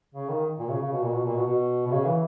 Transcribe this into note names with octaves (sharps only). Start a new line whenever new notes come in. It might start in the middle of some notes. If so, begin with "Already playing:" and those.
C#3
D#3
A#2
C#3
C#3
B2
A#2
B2
A#2
B2
B2
B2
C#3
E3